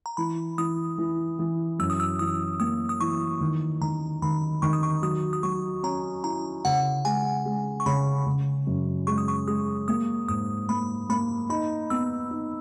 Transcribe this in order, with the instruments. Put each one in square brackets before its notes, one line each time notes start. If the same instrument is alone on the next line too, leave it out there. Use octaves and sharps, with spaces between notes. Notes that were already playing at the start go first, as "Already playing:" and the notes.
[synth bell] A#5
[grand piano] E3 [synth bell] B5
[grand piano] E3 [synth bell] D#6
[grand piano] E3
E3
[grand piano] F#2 [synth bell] E6
[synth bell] D#6
E6
[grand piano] E3 [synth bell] D#6
[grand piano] A#3 [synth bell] D#6
[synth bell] D#6
[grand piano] E3 [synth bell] C#6
[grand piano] D#3
[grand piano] D#3 [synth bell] A#5
[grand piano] D#3 [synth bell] B5
[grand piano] D#3 [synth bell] C#6
[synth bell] D#6
C#6
[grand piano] F#3 [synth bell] D#6
[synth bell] D#6
[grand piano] F#3 [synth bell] C#6
[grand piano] C#4 [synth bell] A#5
[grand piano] E4 [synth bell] A#5
[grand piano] C#3 [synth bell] F#5
[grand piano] G#3 [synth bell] G#5
[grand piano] G#3
[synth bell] C#6
[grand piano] C#3 [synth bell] B5
[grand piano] C#3
F#2
[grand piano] G#3 [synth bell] C#6
[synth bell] D#6
C#6
[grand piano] G#3 [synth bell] D#6
[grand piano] A#3 [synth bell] D#6
[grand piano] G#2 [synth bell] D#6
[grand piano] A#3 [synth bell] B5
[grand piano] A#3 [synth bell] B5
[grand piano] D#4 [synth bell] B5
[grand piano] B3 [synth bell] E6
[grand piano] D#4